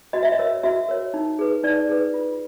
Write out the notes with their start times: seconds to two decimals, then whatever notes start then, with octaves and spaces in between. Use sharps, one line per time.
0.13 F#4 D#5
0.23 E5
0.32 D#5
0.39 A#4 C#5
0.63 F#4 E5
0.89 A#4 C#5
1.14 D#4
1.39 G#4 B4
1.63 D#4 D5
1.89 G#4 B4
2.14 F4